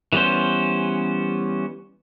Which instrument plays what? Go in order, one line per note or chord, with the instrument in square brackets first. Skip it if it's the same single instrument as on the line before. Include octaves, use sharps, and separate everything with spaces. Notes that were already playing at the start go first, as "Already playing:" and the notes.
[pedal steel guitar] E3 G3 B3 C#4 C5